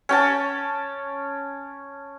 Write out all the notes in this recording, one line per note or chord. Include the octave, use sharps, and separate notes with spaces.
C#4 G5 A5